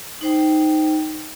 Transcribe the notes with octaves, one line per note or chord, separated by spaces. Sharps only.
D#4 C5 G5